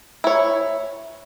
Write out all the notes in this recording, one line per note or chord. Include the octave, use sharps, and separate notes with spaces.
E4 C#5